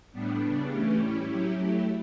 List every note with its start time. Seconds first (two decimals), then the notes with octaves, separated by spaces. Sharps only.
0.12 A2 G3 B3 D4
0.41 C#3 G3 B3 D4
0.69 E3 A3 C#4 G4
0.97 A2 G3 C#4 E4 G4
1.26 F#3 C#4 E4 G4
1.55 F#3 A3 E4 G4